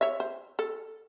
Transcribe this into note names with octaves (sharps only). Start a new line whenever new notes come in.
C#5 E5
C5
A4